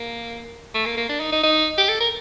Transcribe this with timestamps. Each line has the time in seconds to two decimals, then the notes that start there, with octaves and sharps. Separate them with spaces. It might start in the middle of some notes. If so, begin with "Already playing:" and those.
Already playing: A#3
0.75 A3
0.86 A#3
0.97 A#3
1.09 D4
1.20 D#4
1.32 D#4
1.43 D#4
1.78 G4
1.89 A4
2.00 A#4